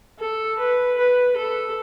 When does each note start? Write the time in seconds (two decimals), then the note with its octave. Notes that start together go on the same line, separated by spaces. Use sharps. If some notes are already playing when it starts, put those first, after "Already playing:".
0.19 A4
0.59 B4
0.98 B4
1.37 A4